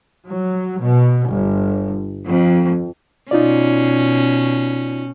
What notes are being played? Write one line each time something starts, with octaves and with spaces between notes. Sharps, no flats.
F#3
B2
G1
F2
B2 C#4 D#4 F4 D5